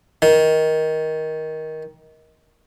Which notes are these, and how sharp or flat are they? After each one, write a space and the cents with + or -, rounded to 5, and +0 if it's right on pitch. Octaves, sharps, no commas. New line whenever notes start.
D#3 +15